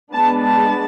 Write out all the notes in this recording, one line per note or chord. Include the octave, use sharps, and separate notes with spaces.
G#3 B3 D4 A5
A5